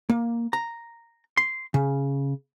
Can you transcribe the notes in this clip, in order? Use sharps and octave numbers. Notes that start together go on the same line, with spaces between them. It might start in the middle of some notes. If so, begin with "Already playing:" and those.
A#3
A#5
C6
C#3